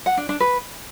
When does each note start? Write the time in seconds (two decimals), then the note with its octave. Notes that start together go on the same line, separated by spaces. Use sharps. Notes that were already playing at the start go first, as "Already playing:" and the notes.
0.06 F#5
0.17 D4
0.29 D4
0.40 B4